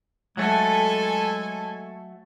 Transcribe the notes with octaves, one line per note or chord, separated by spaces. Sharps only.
F#3 G#3 A3 A4 G#5